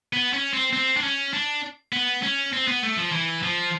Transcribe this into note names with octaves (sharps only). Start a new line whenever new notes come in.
B3
C#4
C4
C4
D4
C#4
D4
B3
C#4
C4
B3
A3
F3
E3
F3